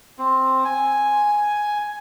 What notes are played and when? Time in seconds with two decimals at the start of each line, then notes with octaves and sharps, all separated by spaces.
0.19 C4
0.65 G#5